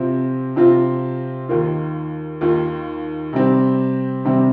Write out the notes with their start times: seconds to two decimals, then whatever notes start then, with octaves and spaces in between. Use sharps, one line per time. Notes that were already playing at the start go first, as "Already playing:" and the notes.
Already playing: C3 F3 C4 F4
0.56 C3 F3 C4 F4
1.49 D#2 D#3 A#3 F4
2.41 D#2 D#3 A#3 F4
3.33 C3 G3 C4 G4
4.25 C3 G3 C4 G4